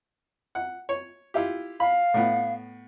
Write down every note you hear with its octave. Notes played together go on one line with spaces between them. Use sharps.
F#5
C#5
E4 F4 G4
F5 B5
A2 B3